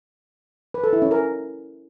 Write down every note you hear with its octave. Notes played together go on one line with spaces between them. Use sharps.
B4
A4
E4
C#4
A#4